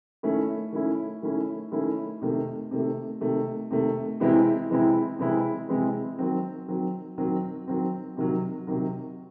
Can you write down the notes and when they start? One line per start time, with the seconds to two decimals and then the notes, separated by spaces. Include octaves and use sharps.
0.23 D#3 A3 C#4 E4
0.72 D#3 A3 C#4 E4
1.22 D#3 A3 C#4 E4
1.72 D#3 A3 C#4 E4
2.21 C3 D#3 A3
2.71 C3 D#3 A3
3.21 C3 D#3 A3
3.71 C3 D#3 A3
4.20 C3 E3 G#3 C4 E4
4.70 C3 E3 G#3 C4 E4
5.19 C3 E3 G#3 C4 E4
5.69 C3 E3 G#3 C4 E4
6.18 D#3 F#3 C4
6.68 D#3 F#3 C4
7.18 D#3 F#3 C4
7.68 D#3 F#3 C4
8.17 C3 D#3 F#3
8.67 C3 D#3 F#3